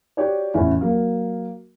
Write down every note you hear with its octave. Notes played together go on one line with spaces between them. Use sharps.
F#4 G4 C#5 D5
A1 E2 C#4 E4
F#3 A#3